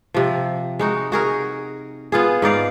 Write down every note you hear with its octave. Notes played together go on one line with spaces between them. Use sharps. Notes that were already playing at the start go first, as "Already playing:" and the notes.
C3 F3
G#3 D#4 F#4
F#4 G#4 A#4
B3 F4 G#4
G#2 D#4 D5 F5